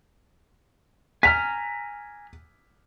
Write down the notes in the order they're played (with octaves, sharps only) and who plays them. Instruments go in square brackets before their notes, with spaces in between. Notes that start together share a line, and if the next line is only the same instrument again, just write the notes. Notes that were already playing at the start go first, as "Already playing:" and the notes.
[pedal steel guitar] G#5 A#5 F6 [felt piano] B6